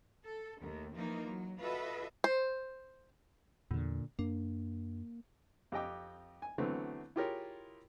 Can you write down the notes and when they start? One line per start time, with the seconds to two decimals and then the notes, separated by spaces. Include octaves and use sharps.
0.24 A4
0.60 D#2 D#3 A3
0.94 E3 F3 A#3 D#4 F4
1.23 F#3
1.58 F4 F#4 A4 B4 D#5 E5
2.24 C5
3.71 E2 A#2 D3
4.19 F#2 A#3 D4
5.72 F2 G4 D#5 G5 D6
6.42 G#5
6.58 D3 E3 F#3 A3 B3 C4
7.16 E4 F4 G4 G#4 A#4 C#5